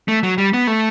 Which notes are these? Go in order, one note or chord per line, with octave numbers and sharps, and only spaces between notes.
A3
F#3
G3
B3
A3